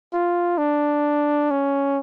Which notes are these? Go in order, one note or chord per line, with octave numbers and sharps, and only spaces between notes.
F4
D4
C#4